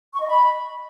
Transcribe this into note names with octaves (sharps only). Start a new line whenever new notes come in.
C#6
D#5
B5